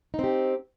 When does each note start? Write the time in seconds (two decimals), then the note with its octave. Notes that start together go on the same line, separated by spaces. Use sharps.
0.14 D#4
0.19 C4
0.24 G4